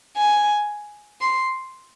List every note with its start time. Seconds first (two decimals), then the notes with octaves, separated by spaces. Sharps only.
0.16 G#5
1.21 C6